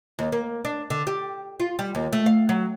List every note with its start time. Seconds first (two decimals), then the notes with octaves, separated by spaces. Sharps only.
0.19 D#2
0.32 A#3
0.65 D4
0.90 D3
1.07 G4
1.60 F4
1.79 G3
1.95 D#2
2.13 A3
2.26 F5
2.49 F#3